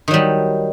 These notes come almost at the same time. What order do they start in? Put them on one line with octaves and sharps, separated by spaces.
D#3 F#3 G3